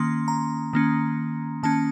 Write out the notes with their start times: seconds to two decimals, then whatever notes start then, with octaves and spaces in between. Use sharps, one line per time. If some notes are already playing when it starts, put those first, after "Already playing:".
Already playing: D#3 A#3 C#4 C6
0.28 A#5
0.73 D#3 A#3 C#4
1.63 D#3 A#3 C#4 A5